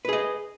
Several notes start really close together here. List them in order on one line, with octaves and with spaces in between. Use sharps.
B4 G#4 D#5